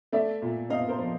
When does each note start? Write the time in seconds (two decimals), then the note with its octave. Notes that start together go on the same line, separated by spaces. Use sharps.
0.13 A3 D5 E5
0.42 A#2
0.69 C4 D#5 F5
0.88 A#4 C5
0.98 F3